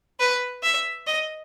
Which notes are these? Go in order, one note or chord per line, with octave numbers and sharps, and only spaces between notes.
B4
E5
D#5